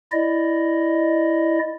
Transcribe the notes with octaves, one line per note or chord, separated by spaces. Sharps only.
E4 D5 D#5